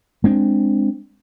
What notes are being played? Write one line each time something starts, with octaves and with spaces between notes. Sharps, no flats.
G#3 C4 D4